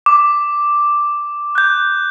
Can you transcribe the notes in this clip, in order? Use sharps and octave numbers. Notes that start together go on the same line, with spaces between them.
D6
F#6 G6